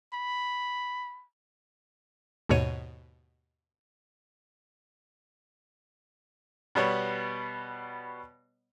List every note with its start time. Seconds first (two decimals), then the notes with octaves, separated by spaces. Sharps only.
0.13 B5
2.49 D#2 G#2 B2 C#5 D#7
6.75 B2 G3 B3 C#5